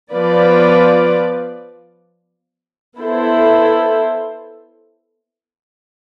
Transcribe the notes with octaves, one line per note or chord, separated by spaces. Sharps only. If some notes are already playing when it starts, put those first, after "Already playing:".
F3 B3 F4 B4 D5
B3 E4 A4 C5